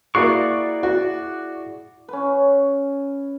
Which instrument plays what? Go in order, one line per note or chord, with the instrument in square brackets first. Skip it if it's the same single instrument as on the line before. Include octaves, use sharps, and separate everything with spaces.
[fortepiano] A#3 F#4 F#6 [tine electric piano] E4 G#4 C7 [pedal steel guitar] D5 C#6
[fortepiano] F#4
[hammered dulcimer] C#4 B4